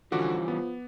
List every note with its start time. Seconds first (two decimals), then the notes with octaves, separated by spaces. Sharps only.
0.12 D3 E3 F3 G3 C#4 F#4 D6
0.48 B3